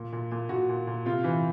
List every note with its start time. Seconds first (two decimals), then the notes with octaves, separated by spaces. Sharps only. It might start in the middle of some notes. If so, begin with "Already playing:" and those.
Already playing: A#2
0.12 A#2
0.31 A#2
0.49 A#2 F#4
0.69 A#2
0.87 A#2
1.06 C3 F4
1.24 E3